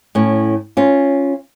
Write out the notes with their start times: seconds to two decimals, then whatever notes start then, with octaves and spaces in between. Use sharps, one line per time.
0.15 A2 C#4
0.77 C#4 F4